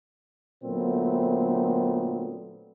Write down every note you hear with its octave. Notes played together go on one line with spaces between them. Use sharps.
A#2 D3 F#3 A3 B3 C4